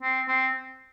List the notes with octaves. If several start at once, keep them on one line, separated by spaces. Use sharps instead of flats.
C4
C4